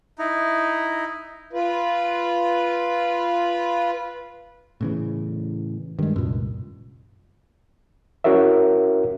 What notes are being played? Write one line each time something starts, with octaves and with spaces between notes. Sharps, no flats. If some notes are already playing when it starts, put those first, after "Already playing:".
D#4 E4
F4 B4
A2 C#3 E3
G2 D#3 G#3
C2 F#2 A#2
C#4 E4 F#4 A#4 C#5 E5